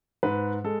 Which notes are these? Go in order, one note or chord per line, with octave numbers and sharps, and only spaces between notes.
G#2 B4
G#3 A4